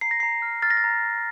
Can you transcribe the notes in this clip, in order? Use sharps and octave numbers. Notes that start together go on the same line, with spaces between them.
A#5 C7
A#6
A#5 C7
F6
F6 A6
A#6
A6
A#5